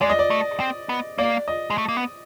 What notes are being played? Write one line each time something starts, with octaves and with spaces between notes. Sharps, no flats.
G#3 D5
D#5
D5
A3
C4
B3
A#3 D5
D#5
G#3
A3
A#3
B3